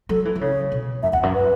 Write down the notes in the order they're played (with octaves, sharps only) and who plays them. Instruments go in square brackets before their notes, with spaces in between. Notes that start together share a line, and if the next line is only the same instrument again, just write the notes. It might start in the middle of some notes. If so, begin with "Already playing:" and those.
[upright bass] F#3 [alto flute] A4
[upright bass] E3
E3
[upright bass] C#3 [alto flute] C#5
[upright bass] B2
[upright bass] F#2 [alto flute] E5
[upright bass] E2 [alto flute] F#5
[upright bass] F#2
[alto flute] B4